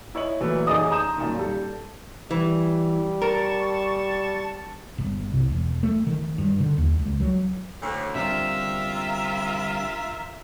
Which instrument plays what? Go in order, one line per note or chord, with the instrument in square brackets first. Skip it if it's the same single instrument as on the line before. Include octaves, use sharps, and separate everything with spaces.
[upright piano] E4 C#5 D#5 F#7
A#2 E3 F#3 A3
A1 D#4 G#4 D5 D#5 D#6
A5 A#5 C6 D#6 G6 E7
F#2 A#2 D#3
G3 A4
[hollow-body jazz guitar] E3 [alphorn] G3
[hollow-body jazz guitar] A#4 [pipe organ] A5 C#6 A6
[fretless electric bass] G1
C2
E1
A3
D#3
G2
D3
D#2
C#2
F#3
[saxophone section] D2 A2
[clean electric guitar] D3 G3 C4 [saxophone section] F4 A#4 E5